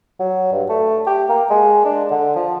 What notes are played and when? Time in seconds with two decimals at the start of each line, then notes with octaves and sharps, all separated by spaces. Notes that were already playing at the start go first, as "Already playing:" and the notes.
0.19 F#3
0.52 G2
0.70 A3
1.07 G4
1.29 A#3
1.50 G#3
1.85 D4
2.10 D3
2.36 F3